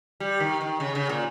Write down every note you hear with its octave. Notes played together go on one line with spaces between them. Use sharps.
G3
D#3
D#3
C#3
C#3
A#2